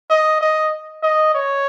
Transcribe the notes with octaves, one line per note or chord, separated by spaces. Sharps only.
D#5
D#5
D#5
C#5